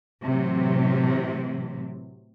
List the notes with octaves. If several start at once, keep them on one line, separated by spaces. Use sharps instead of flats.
A2 C3 E3 F#3